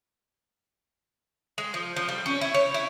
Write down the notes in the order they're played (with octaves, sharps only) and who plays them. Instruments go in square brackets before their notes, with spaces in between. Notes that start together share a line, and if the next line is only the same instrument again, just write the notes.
[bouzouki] G#3
F3
F3
G3
C#4
E4
C#5
E4